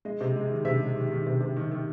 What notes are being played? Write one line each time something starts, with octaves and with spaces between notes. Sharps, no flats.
G#3 D#5
C3
G#3
D#3
C3 E5
G#3
D#3
D#3
C3
C3
D#3
D#3